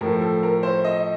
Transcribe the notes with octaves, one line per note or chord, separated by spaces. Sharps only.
A2 F3 A#4
A4
A#4
C5
D#5